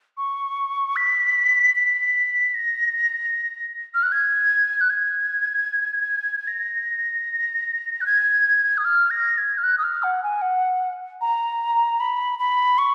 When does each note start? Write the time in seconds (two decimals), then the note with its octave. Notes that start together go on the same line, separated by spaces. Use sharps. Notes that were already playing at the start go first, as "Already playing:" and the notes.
0.18 C#6
0.96 B6
1.75 B6
2.55 A#6
3.94 F6
4.03 F#6
4.12 G#6
4.81 F#6
4.90 G#6
6.47 A#6
8.01 F#6
8.06 G#6
8.78 D#6
8.85 F6
9.10 A#6
9.38 G#6
9.58 F6
9.63 F#6
9.78 D#6
9.83 F6
10.03 F#5
10.23 G#5
10.42 F#5
11.21 A#5
12.00 B5
12.39 B5
12.78 C#6